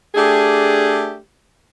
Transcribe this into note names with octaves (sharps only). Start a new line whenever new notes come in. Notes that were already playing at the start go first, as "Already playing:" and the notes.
A3 D4 G4 G#4